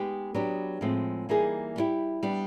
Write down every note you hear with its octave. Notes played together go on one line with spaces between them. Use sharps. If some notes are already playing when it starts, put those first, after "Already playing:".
Already playing: G#3 B3 D#4 G4
F#3 B3 D4 G4
A2 F3 G#3 C4
E3 G3 A#3 D#4 G#4
G3 B3 E4 G4
G3 B3 D4